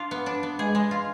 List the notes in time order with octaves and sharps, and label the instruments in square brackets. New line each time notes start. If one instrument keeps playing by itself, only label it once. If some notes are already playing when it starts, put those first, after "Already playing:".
Already playing: [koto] D4 F4
B3
D4
B3
[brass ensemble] G#3 [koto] G#4
[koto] G#3
F4